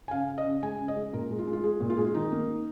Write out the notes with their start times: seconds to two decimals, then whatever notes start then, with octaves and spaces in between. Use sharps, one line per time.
0.08 G#5
0.11 C#3 F5
0.29 C#3
0.38 D#5
0.45 C#3
0.62 G#3 G#5
0.79 C#3
0.88 D#5
0.97 G#3
1.13 A#2 A#4
1.31 G#3
1.39 F4
1.47 G#3
1.53 F4
1.63 G#3 G#4
1.80 A#2
1.90 F4
1.97 G#3 G#4
2.04 F4
2.14 D#3 D#4
2.32 A#3